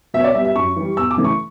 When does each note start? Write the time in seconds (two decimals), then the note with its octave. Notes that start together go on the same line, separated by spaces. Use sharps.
0.14 B2 E5
0.20 C#5
0.24 D5
0.35 G3 B3 E5
0.45 E5
0.56 F#2 C#6
0.76 E3 G3
0.97 E2 E6
1.11 D6
1.17 C#3 E3 A3
1.24 C#6